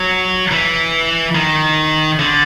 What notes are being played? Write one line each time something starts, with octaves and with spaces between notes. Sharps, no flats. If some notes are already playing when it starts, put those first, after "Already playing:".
Already playing: F#3
E3
D#3
D3